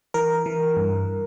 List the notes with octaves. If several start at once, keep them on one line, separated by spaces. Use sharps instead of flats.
E3 A#4
E3
G2